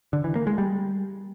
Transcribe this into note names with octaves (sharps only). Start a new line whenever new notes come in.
D3
E3
A#3
G#3
G3